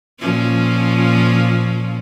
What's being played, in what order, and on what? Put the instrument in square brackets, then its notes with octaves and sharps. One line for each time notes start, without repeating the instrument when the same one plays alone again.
[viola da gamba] A#2 F3 C#4